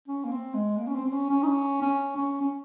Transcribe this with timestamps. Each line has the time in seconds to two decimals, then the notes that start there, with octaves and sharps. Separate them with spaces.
0.08 C#4
0.25 A#3
0.32 C4
0.54 G#3
0.78 A#3
0.87 C#4
0.95 C4
1.06 C4
1.12 C#4
1.30 C#4
1.42 D#4
1.47 C#4
1.82 C#4
2.16 C#4
2.41 C#4